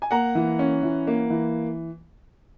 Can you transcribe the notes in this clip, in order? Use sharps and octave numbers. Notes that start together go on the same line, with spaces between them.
G#5
A#3 F#5 A#5
E3
C#4
E3
A#3
E3